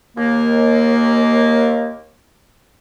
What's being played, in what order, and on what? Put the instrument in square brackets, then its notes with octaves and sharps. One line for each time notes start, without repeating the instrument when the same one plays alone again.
[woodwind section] D#2 A#3